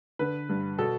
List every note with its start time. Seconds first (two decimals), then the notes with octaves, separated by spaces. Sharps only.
0.19 D3 B4
0.49 G2
0.78 B2 A4